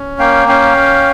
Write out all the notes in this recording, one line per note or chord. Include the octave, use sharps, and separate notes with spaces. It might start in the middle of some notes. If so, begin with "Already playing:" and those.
Already playing: C#4
A#3 F5 G5
C#4 F5 G5